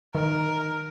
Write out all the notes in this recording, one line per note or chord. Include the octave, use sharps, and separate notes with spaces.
D#3 A#4